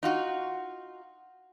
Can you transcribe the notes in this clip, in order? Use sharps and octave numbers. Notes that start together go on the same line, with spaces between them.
D#4 F4 F#4